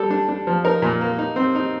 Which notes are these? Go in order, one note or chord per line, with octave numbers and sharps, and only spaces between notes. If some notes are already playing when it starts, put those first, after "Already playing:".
Already playing: G3 A4
D4
D4
F3
D#4 A#4
A#2
A#3
D#4
C4
D#4